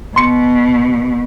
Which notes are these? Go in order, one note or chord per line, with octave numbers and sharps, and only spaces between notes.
B2 C6 C#7